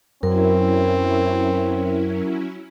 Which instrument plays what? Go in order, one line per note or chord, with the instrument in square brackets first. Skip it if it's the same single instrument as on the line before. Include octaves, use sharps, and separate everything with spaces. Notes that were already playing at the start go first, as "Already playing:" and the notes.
[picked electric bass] F#2 [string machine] F#3 C#4 E4 [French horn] C4 [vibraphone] A#4